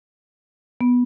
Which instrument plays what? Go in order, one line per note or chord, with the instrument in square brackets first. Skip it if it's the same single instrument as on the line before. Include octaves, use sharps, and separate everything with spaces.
[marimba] B3